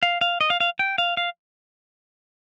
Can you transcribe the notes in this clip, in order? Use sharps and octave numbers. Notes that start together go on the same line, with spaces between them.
F5
F5
D#5
F5
F5
G5
F5
F5